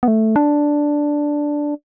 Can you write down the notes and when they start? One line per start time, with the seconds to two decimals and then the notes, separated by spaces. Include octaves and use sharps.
0.03 B3
0.08 A3
0.36 D4